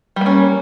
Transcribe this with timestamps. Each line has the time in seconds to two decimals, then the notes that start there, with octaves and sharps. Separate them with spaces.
0.16 G3
0.21 A#3
0.26 C#4